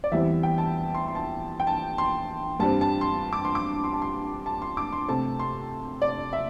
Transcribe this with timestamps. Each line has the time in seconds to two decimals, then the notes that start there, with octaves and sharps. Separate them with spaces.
0.04 D5
0.12 E2 E3 G3 C4 E5
0.43 G5
0.58 A5
0.94 C6
1.08 C6
1.15 A5
1.60 G5
1.67 A5
1.98 C6
2.59 G2 G3 C4 A5
2.81 A5
3.01 C6
3.33 D6
3.45 C6
3.55 D6
3.84 C6
3.93 A5
4.02 C6
4.46 A5
4.62 C6
4.77 D6
4.93 C6
5.09 C3 A3 C4 A5
5.39 C6
6.02 D5
6.33 E5